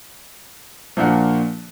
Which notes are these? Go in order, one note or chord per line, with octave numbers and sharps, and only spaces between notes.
A#2 F3 A#3 D4 F#4